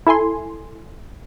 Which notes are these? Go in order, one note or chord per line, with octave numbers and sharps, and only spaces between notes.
E4 A4 G#5 C6